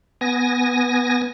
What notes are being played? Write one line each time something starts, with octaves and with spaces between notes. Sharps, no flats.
B3 G#5 A#6